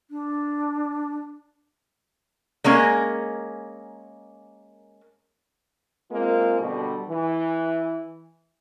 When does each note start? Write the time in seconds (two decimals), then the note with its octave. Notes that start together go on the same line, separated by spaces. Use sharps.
0.11 D4
2.64 G#3 A#3 C#4 A#4
6.12 G#3 A#3 C4 F4 A#4
6.60 B2 D3 G3
7.09 E3